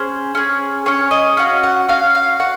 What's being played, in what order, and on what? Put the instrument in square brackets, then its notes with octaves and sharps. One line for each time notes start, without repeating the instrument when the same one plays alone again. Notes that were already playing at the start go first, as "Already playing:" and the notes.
Already playing: [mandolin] C#4 G#4 C5
C#4 G#4
C#4 G#4 C#5
D#5
C#4 F#4 F5
F#5
C#4 F#4 F5
F5
F#4 F#5